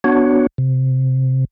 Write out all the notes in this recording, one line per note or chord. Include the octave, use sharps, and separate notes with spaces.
B3 D4 F#4 C#5
C3